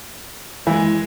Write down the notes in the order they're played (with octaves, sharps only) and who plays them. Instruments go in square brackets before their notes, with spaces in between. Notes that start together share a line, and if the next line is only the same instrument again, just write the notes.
[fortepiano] E3 [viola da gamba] G#3